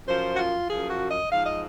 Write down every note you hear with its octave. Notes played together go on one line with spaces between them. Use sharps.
F#2 F3 C5
F#4
F4
F#2 F3 G#4
F#4
D#5
G#2 F3 F5
D#5